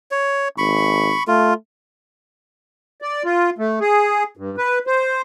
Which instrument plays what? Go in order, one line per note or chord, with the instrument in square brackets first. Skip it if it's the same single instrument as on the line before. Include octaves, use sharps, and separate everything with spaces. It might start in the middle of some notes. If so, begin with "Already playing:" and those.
[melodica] C#5
[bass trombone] G#1 [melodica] B5 C#6
[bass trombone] A3 [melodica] F4
[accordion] D5
F4
A3
G#4
G2
B4
C5